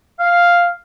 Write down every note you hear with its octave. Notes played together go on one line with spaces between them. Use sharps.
F5